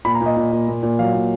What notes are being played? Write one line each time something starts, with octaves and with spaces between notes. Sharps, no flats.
A#2 B5
A#5
A#2
D#5
A#2
A#2
A#2
A#2
F#3 F5
A#2